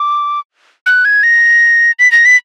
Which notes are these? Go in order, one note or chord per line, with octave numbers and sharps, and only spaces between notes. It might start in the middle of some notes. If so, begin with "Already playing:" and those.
Already playing: D6
F#6
G#6
A#6
B6
A#6
B6